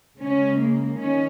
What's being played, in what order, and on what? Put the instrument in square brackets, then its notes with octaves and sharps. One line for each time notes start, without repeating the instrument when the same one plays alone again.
[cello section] C#3 G#3 C#4
A#3
D#3 C#4